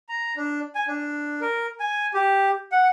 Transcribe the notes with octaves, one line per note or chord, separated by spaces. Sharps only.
A#5
D4
G#5
D4
A#4
G#5
G4
F#5